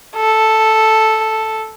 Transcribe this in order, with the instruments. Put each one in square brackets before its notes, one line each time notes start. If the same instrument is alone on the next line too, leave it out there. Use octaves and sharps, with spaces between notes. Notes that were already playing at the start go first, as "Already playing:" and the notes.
[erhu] A4